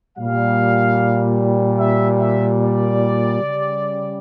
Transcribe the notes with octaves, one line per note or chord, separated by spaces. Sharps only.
A#2 G3 F5
E5
E5
D5
C#3 G3